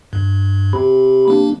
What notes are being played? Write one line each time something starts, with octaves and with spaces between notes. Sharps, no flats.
G2
C3 B5
A#3 D4